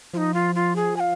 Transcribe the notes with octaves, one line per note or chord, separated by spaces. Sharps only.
F3 D#4 F4
F4
F4
G#4
G#5
F5